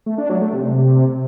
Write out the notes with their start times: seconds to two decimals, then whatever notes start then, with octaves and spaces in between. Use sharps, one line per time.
0.06 A3
0.18 D4
0.30 F#3
0.41 A3
0.53 C3